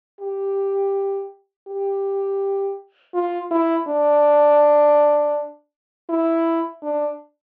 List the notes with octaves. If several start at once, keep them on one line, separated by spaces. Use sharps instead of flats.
G4
G4
F4
E4
D4
E4
D4